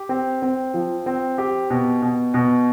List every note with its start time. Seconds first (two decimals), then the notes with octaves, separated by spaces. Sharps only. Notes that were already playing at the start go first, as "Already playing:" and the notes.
Already playing: G4
0.09 C4
0.42 C4
0.74 F3
1.06 C4
1.38 G4
1.70 B2
2.02 B2
2.34 B2